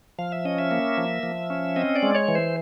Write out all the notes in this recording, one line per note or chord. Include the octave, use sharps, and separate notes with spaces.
F3 F5
E5
C#4 D#5
E5
A#3
F3
F3
C#4
C4 D#5
D5
G#3
C#5
E3
C5